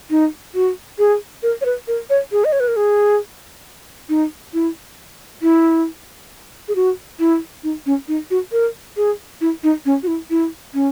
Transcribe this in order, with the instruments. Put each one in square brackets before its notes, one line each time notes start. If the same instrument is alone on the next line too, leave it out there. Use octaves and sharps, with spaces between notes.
[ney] D#4
F#4
G#4
A#4
C#5
B4
A#4
C#5
G#4
D#5
C#5
B4
A#4
G#4
D#4
E4
E4
G#4
F#4
E4
D#4
C#4
D#4
F#4
A#4
G#4
E4
D#4
C#4
F#4
E4
E4
C#4